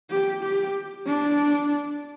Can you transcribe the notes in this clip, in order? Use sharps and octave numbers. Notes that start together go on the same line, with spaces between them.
G4
G4
D4